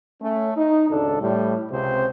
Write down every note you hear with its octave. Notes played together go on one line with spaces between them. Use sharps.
A3 C#4
D#4
G#1 C#2 D4 A4
A2 G3
C#2 C3 C4 C5